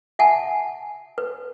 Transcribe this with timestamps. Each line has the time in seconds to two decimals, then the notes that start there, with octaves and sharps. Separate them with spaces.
0.19 E5 F#5 G#5 A5
1.18 B4